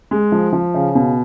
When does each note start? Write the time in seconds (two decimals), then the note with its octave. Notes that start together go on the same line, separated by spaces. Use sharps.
0.11 G#3
0.32 F3
0.53 F3
0.74 C#3
0.95 B2